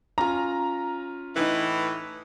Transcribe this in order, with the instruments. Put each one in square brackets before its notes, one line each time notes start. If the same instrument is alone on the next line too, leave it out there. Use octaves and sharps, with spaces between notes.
[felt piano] C#4 F4 [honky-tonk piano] A#5
[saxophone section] A2 E3 [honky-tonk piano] D#4 B4